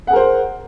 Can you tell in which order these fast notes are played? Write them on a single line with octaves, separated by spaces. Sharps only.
F#5 G#4 A#4 C5